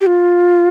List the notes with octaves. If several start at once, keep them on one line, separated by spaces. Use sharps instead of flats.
G4
F4